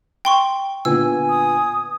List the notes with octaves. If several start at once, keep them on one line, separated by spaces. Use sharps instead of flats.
G5 C6 C#6
A#2 D3 B3 G#5 E6
D#6